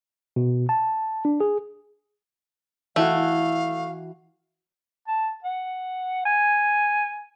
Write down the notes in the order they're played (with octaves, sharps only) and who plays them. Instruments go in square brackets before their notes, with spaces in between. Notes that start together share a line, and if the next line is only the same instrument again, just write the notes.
[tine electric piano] B2
A5
D4
G#4
[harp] E3 E4 F#4 [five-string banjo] A3 [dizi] F5
[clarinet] A5
F#5
G#5